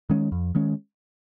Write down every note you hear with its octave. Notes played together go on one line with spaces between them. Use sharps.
D#3 G#3 C#4
F2
D#3 G#3 C#4